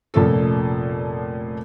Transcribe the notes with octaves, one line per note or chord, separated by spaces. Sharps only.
F1 A#2 F3 C#4 A4